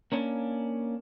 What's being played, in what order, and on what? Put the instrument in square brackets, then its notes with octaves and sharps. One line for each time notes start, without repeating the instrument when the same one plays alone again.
[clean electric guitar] A#3 C#4 D4